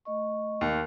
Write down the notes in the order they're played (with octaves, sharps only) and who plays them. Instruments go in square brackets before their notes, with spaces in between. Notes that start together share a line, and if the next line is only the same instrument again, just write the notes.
[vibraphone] A3 D#5 C#6
[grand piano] D#2